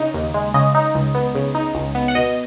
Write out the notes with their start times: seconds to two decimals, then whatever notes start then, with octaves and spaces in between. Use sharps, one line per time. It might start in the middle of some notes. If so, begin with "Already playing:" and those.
Already playing: C#3 D#4
0.14 D#2
0.34 G#3
0.54 C#3 D#5
0.75 D#4
0.95 C#2
1.15 B3
1.35 C#3
1.55 D#4
1.75 C#2
1.95 B3
2.08 F#5
2.15 B2 D#5